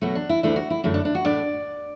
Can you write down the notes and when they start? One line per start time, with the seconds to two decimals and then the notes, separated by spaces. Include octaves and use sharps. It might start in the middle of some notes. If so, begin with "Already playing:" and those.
0.01 B2 F#3 A3 F#4
0.15 D4
0.29 E4
0.43 D2 D3 A3 D4 E4
0.56 F#4
0.70 E4
0.84 F#2 D3 A3 E4
0.94 D4
1.05 D4
1.15 F#4
1.25 A2 A3 D4 D5